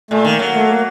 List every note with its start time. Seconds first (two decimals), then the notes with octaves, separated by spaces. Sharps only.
0.11 A#2 A3
0.25 D#3 A#3
0.39 F#3
0.55 A3
0.69 A#3